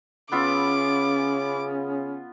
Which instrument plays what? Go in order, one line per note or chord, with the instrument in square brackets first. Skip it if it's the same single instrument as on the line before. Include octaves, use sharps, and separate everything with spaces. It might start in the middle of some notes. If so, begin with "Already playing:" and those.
[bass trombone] C#3 [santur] B3 F4 E5 [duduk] C#4 [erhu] D6